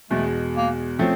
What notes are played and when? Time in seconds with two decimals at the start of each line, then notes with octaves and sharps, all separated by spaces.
0.10 E2 B2 G#3 A3
0.56 A#3
0.99 F3 A3 C4 C#4